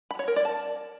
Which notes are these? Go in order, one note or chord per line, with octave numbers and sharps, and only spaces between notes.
B5
C#5
A#4
D5
A5